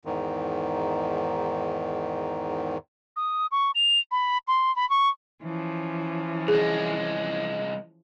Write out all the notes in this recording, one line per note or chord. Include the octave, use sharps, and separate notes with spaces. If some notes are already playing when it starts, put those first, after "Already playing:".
E2 G#2 D#3
D#6
C#6
F7
B5
C6
B5
C#6
E3 F3 C#4
C2 G#3 G#4